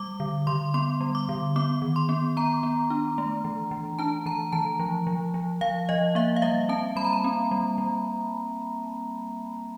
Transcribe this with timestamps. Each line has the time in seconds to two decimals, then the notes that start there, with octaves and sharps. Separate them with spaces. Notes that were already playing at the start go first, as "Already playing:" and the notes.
Already playing: G3 D6
0.20 D3
0.47 D3 C6
0.74 B3 C6
1.01 G3
1.15 D6
1.29 D3
1.56 B3 D6
1.82 D#3
1.96 C6
2.09 B3
2.37 B3 A#5
2.63 B3
2.90 D4
3.18 A3
3.44 E3
3.71 E3
3.99 D4 A5
4.26 E3 A#5
4.52 E3 A5
4.80 F3
5.07 F3
5.34 F3
5.61 F3 F5
5.89 F3 D#5
6.15 A#3 E5
6.36 F5
6.42 G3 E5
6.69 C4 A5
6.96 G3 B5
7.05 A#5
7.13 B5
7.24 C4
7.51 G3
7.78 G3